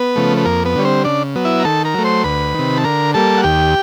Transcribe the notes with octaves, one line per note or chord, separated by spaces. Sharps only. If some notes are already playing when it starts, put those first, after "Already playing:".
Already playing: B3 B4
C#3 F3 A3
B4
F2 A#3 A#4
B3 B4
D3 G3 C#5
C4 C5
C#3 D4 D5
F#3 B3
E4 E5
A#5
D#3 A4 A5
A#4 A#5
F#3 A3
C5 C6
D2 B4 B5
C3 D#3
A5
D3 A#4 A#5
G3 A#3 A4 A5
F#5
D#2 G4 G5